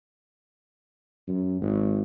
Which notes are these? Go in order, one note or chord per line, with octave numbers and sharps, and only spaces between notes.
F#2
G#1